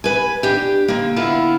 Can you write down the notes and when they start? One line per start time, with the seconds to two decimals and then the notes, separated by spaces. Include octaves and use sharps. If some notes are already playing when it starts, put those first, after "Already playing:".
0.04 B4 G#5
0.43 D4 G4
0.88 D3 A#3
1.16 D3 B3 E4 F4